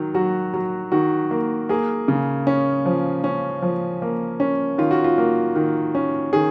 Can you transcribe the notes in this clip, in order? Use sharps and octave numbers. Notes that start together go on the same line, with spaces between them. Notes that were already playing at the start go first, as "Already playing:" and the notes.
Already playing: D#3 F#3
F#3 F#4
F#3
D#3 F#4
A#3
A#3 G#4
C#3
C#4
F3
C#4
F3
A#3
C#4
D#3 F4
F#4
F4
A#3
D#3
C#4
D#3 G#4